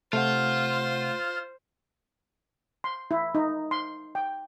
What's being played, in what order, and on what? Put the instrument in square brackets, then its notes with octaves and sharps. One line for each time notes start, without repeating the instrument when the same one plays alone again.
[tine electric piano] C3 F#5 [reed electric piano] A3 [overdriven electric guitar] F4 [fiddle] C5
[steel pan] C6
E4
D#4
C6
G5